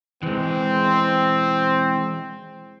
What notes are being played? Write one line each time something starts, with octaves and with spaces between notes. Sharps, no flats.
E3 G#3 C4